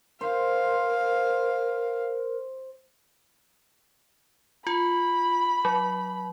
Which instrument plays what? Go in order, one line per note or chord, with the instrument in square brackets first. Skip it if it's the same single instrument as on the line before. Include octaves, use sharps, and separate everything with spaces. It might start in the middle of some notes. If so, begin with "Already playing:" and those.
[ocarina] A#4 [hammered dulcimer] C5 [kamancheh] F5
[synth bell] F4 [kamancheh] B5
[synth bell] F#3